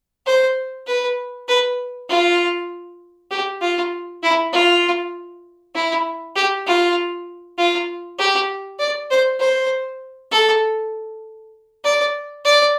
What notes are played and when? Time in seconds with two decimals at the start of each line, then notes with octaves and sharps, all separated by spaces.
0.26 C5
0.87 B4
1.48 B4
2.10 F4
3.31 G4
3.61 F4
4.23 E4
4.53 F4
5.75 E4
6.36 G4
6.66 F4
7.58 F4
8.19 G4
8.79 D5
9.10 C5
9.40 C5
10.31 A4
11.84 D5
12.45 D5